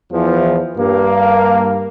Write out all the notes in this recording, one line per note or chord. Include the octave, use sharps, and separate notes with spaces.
E2 E3 F3
G2 A#3